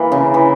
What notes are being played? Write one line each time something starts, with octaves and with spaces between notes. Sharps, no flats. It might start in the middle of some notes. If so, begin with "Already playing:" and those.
Already playing: E3 A#3
C#3
E3